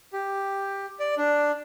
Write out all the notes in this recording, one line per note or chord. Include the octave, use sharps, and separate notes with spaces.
G4
D5
D4